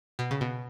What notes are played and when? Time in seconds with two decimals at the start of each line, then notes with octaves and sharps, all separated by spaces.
0.19 B2
0.31 C#3
0.41 B2